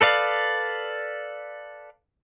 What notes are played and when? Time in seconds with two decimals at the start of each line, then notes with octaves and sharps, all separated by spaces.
0.01 A4 B4 D5 F5